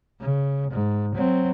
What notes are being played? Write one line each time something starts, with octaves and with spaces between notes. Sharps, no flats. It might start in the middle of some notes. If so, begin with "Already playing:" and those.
C#3
G#2
F#3 C4